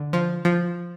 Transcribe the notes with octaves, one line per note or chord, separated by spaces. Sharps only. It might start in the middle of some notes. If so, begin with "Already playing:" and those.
Already playing: D3
F3
F3